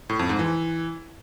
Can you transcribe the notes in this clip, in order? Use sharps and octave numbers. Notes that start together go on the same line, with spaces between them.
A2
F2
G#2
E3